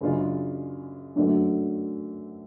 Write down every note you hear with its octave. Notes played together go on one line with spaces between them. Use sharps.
F#2 C#3 G#3 D4 F4
F#2 D3 F#3 A3 D4